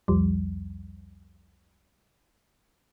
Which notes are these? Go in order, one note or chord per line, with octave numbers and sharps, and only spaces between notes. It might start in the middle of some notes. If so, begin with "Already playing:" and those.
C2 F2 F3 G3